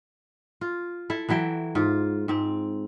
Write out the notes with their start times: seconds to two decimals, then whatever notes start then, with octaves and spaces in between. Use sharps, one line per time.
0.61 F4
1.10 E4 A4
1.29 E3 F#3 E4 G5
1.75 G#2 F4
2.28 G#2 C4